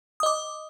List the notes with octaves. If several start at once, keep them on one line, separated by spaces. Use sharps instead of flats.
D#5 D6 D#6